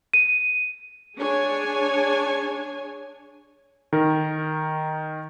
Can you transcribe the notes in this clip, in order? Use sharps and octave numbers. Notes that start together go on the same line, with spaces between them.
D#7
D4 G#4 C#5 G#5
D#3 A#4